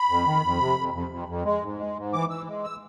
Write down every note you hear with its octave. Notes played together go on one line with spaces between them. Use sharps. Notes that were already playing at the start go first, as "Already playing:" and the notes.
Already playing: B5
F2
D#3
F2
C3
F2
F2
F2
F2
G#3
G#2
G#3
G#2
E3 D6
E3 E6
G#3
E6